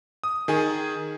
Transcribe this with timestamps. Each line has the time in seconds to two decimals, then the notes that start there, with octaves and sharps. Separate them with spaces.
0.24 D#6
0.48 D#3 G#4 G#5